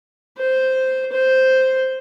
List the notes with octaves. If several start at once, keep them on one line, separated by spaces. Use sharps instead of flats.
C5
C5